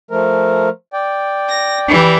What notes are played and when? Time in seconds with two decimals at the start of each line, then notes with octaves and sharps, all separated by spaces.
0.11 F3 A3 A#4
0.93 D5 G5
1.49 A#6
1.87 E3 G3